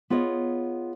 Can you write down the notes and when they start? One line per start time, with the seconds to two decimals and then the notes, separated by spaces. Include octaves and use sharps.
0.10 B3 F4 G#4 C#5 D#5